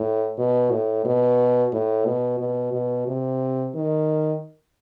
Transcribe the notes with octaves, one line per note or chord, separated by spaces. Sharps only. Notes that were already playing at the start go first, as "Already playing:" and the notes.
Already playing: A2
B2
A2
B2
A2
B2
B2
B2
C3
D#3